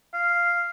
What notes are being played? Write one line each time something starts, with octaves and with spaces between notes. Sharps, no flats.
F5